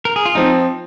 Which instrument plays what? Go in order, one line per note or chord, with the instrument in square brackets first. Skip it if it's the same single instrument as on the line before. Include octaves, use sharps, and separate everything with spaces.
[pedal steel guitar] A#4
G#4
F4
[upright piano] F3 C4 [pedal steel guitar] D#4